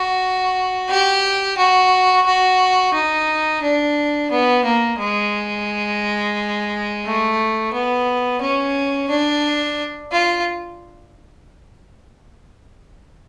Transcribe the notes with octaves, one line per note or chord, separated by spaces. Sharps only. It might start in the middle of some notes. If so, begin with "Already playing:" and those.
Already playing: F#4
G4
F#4
F#4
D#4
D4
B3
A#3
G#3
A3
B3
C#4
D4
F4